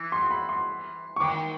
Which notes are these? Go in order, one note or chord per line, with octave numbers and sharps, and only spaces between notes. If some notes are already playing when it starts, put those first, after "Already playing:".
Already playing: E3
C6
C6
B5
C6
C#6
D#3 D6